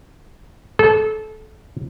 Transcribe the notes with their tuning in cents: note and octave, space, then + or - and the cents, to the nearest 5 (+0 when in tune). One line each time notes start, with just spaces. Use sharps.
A4 -25